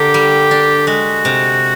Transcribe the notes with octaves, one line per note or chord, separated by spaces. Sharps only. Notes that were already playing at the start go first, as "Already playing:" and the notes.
Already playing: D3 A#3 G4
G3
D4
G#3 F#4
C3